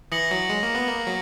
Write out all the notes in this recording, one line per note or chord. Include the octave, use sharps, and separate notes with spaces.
E3 D#6 A#6 C#7 F#7
F#3
G#3
A#3
B3
A#3
F#3